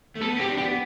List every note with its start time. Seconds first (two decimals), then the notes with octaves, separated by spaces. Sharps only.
0.15 A3
0.22 B3 A4
0.36 C4 G4
0.50 D4
0.58 G4
0.63 B3